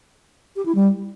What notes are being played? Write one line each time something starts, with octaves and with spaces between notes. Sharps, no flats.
G4
E4
G3